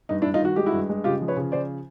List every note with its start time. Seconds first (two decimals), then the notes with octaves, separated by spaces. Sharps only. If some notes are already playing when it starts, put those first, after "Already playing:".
0.09 G2 D#4
0.22 D4 E4
0.26 G2
0.34 D#4 F4
0.41 D#3 F#4
0.56 G#3 G4
0.66 E4 F#4
0.73 G2
0.90 G#3
1.04 C#3 F4 G4
1.21 F3
1.28 B4 C#5
1.37 C#3
1.52 F3 C5 D5